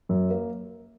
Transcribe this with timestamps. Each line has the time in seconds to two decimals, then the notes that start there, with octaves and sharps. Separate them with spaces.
0.09 F#2
0.30 A#3